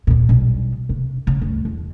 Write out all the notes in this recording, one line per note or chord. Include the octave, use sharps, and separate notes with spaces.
D#2 A#2
B1 G3
C3
C#3
D2 G2
E2